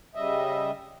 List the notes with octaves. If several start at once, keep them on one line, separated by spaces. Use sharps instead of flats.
C#3 G3 D#5 E5